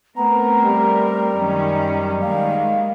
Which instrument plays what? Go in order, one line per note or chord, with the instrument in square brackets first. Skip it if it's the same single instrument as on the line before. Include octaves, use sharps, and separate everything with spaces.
[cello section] A3 C4 A#4 [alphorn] B3 [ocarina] A#5
[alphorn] G3
[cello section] F#2 D#3 C#4
[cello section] D#3 G#3 A#3 [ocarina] F5